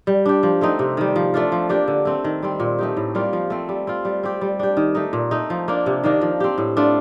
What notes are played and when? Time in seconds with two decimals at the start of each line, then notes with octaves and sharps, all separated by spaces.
0.07 G3
0.26 D4 G4
0.43 F3
0.61 A3 C4 D#4
0.79 C3
0.97 D#3 G3
1.16 F3
1.34 A3 D4 F4
1.52 F3
1.69 A#3 D4 G4
1.88 D3
2.05 A3 C4
2.24 D#3
2.43 G3 C4
2.60 A#2
2.79 A3 D#4 G4
2.97 A2
3.15 G3 A#3 F4
3.33 F3
3.50 A3 C4
3.69 G3
3.87 C4 F4
4.05 G3
4.23 C4 G4
4.41 G3
4.59 D4 G4
4.77 D#3
4.95 A3 D#4
5.13 A#2
5.31 A3 D#4
5.50 F3
5.68 A#3 D4
5.86 C3
6.04 D#3 A#3 D4
6.21 F3
6.40 C4 G4
6.58 A2
6.77 A3 D4 F4